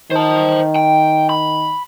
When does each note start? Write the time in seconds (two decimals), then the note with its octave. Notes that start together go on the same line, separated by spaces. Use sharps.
0.11 D#3 C5 A5
0.76 G5
1.29 B5